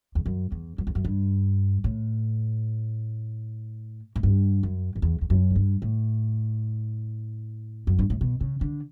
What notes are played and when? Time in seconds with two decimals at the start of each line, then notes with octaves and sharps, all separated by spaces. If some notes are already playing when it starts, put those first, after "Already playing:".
0.15 E2
0.26 F#2
0.52 E2
0.78 F#2
0.87 E2
0.95 F#2
1.05 G2
1.84 A2
4.16 A2
4.23 G2
4.63 F#2
4.95 F#2
5.02 E2
5.21 E2
5.30 F#2
5.50 A2
5.56 G2
5.82 A2
7.87 F#2
7.99 G2
8.10 A2
8.21 B2
8.41 C#3
8.61 D3